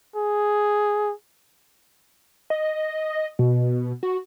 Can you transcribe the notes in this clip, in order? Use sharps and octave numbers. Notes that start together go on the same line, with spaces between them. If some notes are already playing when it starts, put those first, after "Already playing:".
G#4
D#5
B2
F#4